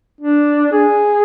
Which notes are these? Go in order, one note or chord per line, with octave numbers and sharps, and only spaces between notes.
D4
G#4